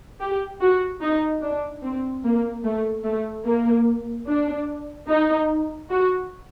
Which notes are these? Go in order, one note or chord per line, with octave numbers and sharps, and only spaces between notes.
G4
F#4
D#4
D4
C4
A#3
A3
A3
A#3
D4
D#4
F#4